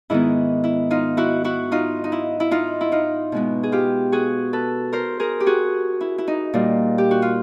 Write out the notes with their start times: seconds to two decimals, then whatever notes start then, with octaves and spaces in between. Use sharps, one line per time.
0.10 G#2 D#3 G#3 B3 E4
0.64 E4
0.91 D#4 F4
1.17 E4 F#4
1.44 E4 F#4
1.72 D#4 F4
2.04 D#4
2.12 E4
2.40 E4
2.51 D#4 F4
2.81 E4
2.92 D#4 F4
3.32 B2 G#3 B3
3.63 G#4
3.72 F4 G4
4.12 F#4 G#4
4.53 A4 B4
4.93 A#4 C5
5.20 G#4 A#4
5.40 G4
5.46 F#4 G#4
6.01 E4
6.18 E4
6.27 D#4
6.54 A#2 G3 A#3
6.98 G4
7.11 F#4
7.22 F4